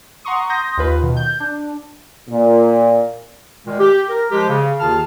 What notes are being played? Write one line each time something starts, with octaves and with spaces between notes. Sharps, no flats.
F#5 A#5 C6 C#6 D#6
C6 D#6 G6 A#6
D#2 F4 B4
B2 D#3
G6
D4
A#2
A#2 D#3 G#3
G4
A#4
F3 G#3 G4
C#3
D#2 D#3 F4 G#4 A5 F6